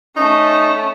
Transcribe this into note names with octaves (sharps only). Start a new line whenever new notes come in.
A3 C#4 D#4